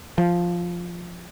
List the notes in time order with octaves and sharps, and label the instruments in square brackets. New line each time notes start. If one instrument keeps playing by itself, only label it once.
[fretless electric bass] F3